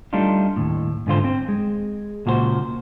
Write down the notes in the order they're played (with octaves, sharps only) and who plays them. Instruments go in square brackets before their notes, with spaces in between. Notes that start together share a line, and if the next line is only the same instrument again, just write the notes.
[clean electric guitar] G3 A3 D4 D#4 F4
D#2 A2
G#2 D3 F4 C5
C4
G#3
C#2 A#2 F#4 G4 C5